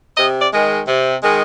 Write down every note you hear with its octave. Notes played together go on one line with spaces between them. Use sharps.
C3 D#5
D5
D#3 G#3
C3
D#3 G#3